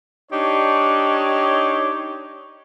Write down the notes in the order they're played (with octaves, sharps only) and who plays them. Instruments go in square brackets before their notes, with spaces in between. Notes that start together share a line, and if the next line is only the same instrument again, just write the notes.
[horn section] D4 D#4 G4 C#5